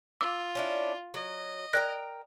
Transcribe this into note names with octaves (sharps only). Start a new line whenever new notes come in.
F4 D6 E6
C#4 D4 E4
F#3 D#5
A#4 D5 G5 A#5 F#6 A#6